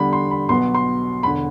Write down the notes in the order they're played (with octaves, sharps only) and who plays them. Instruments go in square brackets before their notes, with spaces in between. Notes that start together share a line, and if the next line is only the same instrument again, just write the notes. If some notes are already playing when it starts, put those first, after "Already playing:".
Already playing: [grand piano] E2 D3 G3 B5
C6
B5
B1 B2 F#3 B3 C6
C6
E1 D3 B5